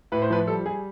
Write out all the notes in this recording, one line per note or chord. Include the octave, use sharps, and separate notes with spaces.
A2 B4
C5
F3 B4
G3 A4
G3 G#4